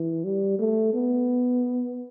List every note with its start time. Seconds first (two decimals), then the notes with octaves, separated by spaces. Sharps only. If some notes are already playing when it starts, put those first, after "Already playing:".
Already playing: E3
0.24 G3
0.59 A3
0.94 B3